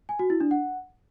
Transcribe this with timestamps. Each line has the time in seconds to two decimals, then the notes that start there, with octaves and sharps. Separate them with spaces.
0.09 G#5
0.19 F#4
0.30 E4
0.40 D4
0.51 F#5